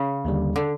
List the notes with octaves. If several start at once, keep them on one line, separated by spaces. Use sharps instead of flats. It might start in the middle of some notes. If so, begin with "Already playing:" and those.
Already playing: C#3
D#2 D3 G3
D3